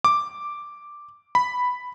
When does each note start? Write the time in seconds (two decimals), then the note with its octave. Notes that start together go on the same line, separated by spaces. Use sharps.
0.04 D6
1.35 B5